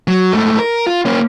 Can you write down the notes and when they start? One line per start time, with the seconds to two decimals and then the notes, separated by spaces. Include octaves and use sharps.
0.08 F#3
0.32 G#2 A3
0.59 A#4
0.87 F4
1.05 A#3 C#4